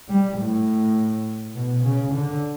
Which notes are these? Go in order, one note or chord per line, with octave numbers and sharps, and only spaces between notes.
G3
A2
B2
C#3
D3